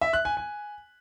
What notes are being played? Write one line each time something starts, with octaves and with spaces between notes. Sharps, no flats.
E5
F#6
G#5
G#5